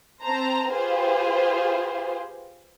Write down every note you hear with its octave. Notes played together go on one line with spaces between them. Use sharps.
C4 C5 A5 A#5
F4 G4 G#4 B4 C5